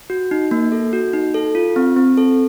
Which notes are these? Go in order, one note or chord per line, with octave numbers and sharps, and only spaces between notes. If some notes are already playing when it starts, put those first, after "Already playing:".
F#4
D#4
A#3
A4
F#4
D#4
A4
F4
C4
C4
A4